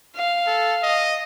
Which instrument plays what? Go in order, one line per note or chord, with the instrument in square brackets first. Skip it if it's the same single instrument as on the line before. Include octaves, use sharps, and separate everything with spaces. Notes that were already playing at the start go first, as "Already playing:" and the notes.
[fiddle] F5
[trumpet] A4
D#5